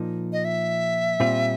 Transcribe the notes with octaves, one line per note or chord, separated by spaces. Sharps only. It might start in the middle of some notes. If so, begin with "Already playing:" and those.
Already playing: A#2 F3 A#3 D#4
D#5
E5
A#2 G3 C4 F4